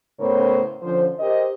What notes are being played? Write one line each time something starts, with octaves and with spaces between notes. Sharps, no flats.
A2 C#3 B3 A#4 C5 C#5
D3 F3 C#4 C5
G4 A#4 C5 D#5